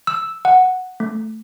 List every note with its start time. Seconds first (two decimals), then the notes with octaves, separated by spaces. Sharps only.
0.07 E6
0.45 F#5
1.00 A3